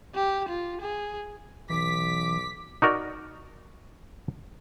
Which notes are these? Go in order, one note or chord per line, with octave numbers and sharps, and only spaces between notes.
G4
F4
G#4
B1 E3 D6 B6
D#4 F#4 A#4 D5